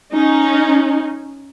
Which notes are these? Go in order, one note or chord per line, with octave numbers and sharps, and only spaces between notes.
C#4 D#4